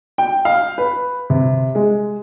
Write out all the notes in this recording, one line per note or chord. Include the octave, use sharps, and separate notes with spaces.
G5
F5
B4
C3
G#3